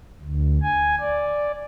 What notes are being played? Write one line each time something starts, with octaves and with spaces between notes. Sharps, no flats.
D2
G#5
D5